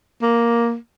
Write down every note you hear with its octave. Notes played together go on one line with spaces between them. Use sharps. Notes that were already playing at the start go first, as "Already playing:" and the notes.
A#3